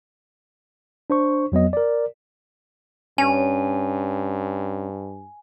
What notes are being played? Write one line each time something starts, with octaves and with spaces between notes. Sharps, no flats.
D4 C5 C#6
F2 F#3 B3 D#5
A#4 D5
G2 C#4 G#5